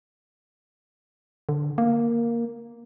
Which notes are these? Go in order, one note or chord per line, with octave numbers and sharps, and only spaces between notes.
D3
A#3